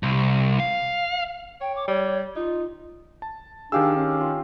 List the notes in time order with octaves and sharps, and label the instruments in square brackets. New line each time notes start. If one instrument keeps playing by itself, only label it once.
[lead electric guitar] C2
F5
[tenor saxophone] C#5 [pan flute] G5
[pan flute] D6
[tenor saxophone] G3 [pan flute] C#5
[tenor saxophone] D#4 [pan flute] F4
[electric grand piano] A5
[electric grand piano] D#3 F5 E6 [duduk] D4 [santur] G4 G#4
[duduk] C#4
[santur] F4